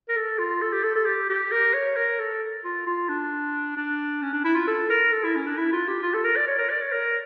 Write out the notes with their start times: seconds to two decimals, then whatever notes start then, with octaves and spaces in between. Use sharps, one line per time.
0.09 A#4
0.16 A4
0.39 F4
0.62 A4
0.73 G4
0.84 A4
0.96 A4
1.06 G4
1.29 G4
1.52 A#4
1.74 C#5
1.96 A#4
2.20 A4
2.65 F4
2.86 F4
3.09 D4
3.77 D4
4.22 C#4
4.33 D4
4.45 E4
4.55 F4
4.67 A4
4.90 A#4
5.12 A4
5.24 E4
5.35 C#4
5.46 D4
5.58 E4
5.73 F4
5.88 G4
6.03 F4
6.14 A4
6.25 A#4
6.36 D5
6.48 C#5
6.59 A#4
6.70 D5
6.81 C#5
6.92 A#4